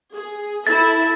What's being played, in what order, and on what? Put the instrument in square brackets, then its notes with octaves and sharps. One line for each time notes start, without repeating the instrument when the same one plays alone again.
[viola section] G#4
[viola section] E4 A4 E5 [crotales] A6